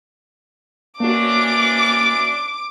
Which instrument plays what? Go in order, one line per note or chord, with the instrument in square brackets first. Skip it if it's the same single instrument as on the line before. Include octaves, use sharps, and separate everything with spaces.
[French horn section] E3 C#4 D4 [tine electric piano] A#3 F#4 [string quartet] D6